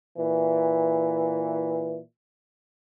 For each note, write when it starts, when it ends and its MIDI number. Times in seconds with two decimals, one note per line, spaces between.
0.18 1.99 46
0.18 1.99 52